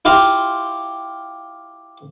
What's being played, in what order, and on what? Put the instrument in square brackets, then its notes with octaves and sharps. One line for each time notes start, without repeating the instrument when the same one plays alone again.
[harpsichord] E4 F4 G4 F5 A#5 C6